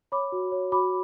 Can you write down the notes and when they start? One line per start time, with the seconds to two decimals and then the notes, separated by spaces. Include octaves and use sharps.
0.12 C#5 B5 D6
0.32 F#4
0.52 C#5
0.72 F#4 B5 D6